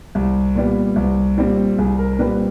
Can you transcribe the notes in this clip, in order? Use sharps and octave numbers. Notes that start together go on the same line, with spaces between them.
C2
A#2 G3 B3
C2
A#2 G3 C4
C2 G#4
A#4
A#4
A#2 G3 C4 B4